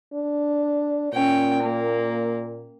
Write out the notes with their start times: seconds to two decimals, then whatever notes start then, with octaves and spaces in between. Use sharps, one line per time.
0.14 D4
1.13 A#2 C#4 G5
1.61 A#3